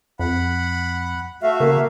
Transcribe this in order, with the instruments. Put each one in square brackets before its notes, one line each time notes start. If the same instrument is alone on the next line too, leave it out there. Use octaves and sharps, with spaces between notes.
[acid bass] F2 [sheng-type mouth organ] F#5 B5
[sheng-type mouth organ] A3 F#4 F5 [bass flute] E5
[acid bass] C#3 [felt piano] A#3